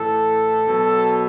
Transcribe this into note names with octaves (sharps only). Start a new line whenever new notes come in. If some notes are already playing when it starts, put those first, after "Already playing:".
Already playing: A2 E3 A4
B2 F#3